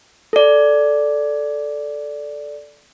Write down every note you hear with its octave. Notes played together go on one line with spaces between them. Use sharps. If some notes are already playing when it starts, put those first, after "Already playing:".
A4 D5